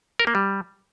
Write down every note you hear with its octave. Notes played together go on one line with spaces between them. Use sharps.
A#4
A#3
G3